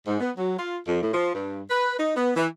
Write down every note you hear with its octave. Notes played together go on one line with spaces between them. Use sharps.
G#2
B3
F#3
F4
F2
A2
F3
G2
B4
D#4
B3
E3